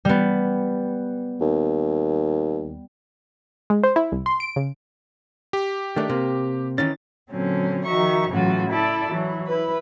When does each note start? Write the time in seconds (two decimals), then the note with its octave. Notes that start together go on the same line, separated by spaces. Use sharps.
0.05 G3 B3
1.41 D#2
3.70 G#3
3.84 C5
3.96 E4
4.12 C2
4.26 C6
4.40 D7
4.56 C#3
5.53 G4
5.96 D#3 A3 D4
6.10 C3 A#3
6.78 D#3 E3 C#4 A6
7.31 A#2 D3 F#3 C4 C#4
7.85 D#3 F3 F#4 E5 A#5 C#6
8.29 A2 C#3 E3 F#3 F4 F#4
8.69 E4 A4 D5 B5
9.08 E3 F#3 E4
9.47 E4 B4